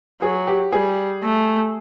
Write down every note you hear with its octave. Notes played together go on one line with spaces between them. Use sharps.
F#3 G#4
G4
G3 G#4
A3